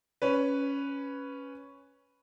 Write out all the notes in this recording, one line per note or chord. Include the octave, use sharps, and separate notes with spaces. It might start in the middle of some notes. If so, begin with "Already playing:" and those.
C#4 B4